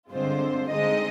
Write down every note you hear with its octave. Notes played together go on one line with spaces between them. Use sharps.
G2 D3 G#3 C4 F4 C5
D3 G#3 C4 D#4 D#5